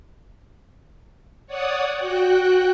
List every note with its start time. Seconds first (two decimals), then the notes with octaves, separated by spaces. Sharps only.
1.47 C#5 D5 F#5 D#6
1.98 F#4 G5 F#6